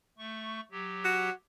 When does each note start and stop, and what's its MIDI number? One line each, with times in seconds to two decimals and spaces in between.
0.18 0.61 57
0.18 0.61 85
0.71 1.30 54
0.71 1.30 67
1.05 1.31 66